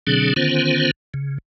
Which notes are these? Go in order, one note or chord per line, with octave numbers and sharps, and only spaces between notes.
B2 D3 F#3 C4 D4 G#4
D3 D#3 B3 C#4 F4 C5
C#3